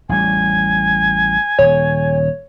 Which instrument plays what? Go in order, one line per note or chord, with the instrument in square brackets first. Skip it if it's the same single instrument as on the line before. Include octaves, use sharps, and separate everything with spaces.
[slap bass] A1 G3 [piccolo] G#5
[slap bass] D#1 [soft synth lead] C#5